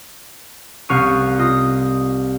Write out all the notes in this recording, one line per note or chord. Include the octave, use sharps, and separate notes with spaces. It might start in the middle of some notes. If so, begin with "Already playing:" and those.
C2 F5 C#6 F#6 D#7
F4 D#5